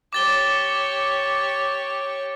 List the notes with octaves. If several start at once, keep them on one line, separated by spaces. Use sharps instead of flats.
G4 C#5 D6 A6 G7